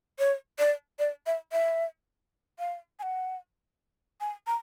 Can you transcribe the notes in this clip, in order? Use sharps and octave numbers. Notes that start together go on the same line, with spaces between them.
C#5
D5
D5
E5
E5
F5
G#5
F#5
G#5
A#5